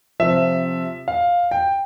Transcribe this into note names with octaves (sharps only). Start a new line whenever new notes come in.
C3 F3 E5
F5
G5